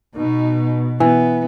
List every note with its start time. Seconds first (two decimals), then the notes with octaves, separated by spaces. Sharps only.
0.16 B2 D#4
1.00 E3 B3